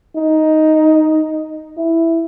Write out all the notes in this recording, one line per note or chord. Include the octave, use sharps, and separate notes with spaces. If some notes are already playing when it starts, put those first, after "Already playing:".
D#4
E4